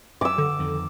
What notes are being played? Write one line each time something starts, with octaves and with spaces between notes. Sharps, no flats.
F#2 D6 E6
D3
F2 D#3